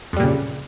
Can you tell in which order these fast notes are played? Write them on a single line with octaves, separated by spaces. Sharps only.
F2 G3 A#2 C#3